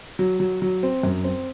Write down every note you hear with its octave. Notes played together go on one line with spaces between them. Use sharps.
F#3
F#3
F#3
C4
F#2
C4